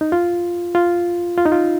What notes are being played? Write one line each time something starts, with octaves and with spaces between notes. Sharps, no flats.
D#4
F4
F4
F4
D#4
F4